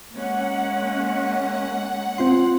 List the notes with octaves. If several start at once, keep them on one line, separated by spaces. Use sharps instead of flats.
G#3 A#3 C#4 F#5
C4 F4 C6